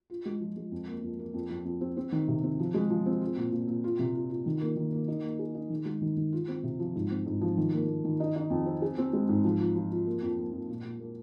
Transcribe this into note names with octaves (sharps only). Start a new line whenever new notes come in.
F4
G#3
F3
G#3
F2
A#3
F2
A#3
F2
F2
F2
C4
C4
D#3
C3
C4
F3
G#3
F3
C4
F4
A#2
A#2
A#2
F4
C3
F4
F4
D#3
A#3
D#3
A#3
D#4
A#3
G#4
D#4
D#3
G#3
D#3
D#3
F4
C4
C3
F3
G#2
C4
G#2
F3
D#3
A#3
A#3
D#3
D#4
D#4
F2
C4
G#4
C4
G#3
G#2
F3
F4
F3
F4
A#3
F2
A#3
F2
A#2
A#2
A#3